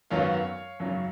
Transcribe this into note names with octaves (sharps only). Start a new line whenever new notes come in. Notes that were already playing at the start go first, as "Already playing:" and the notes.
G#1 F#2 D#3 F#3 B3 C#5 F5
G#1 F#2 C#3 F#3